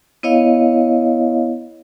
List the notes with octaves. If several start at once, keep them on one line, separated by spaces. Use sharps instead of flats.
B3 E4 C#5 D#5 F5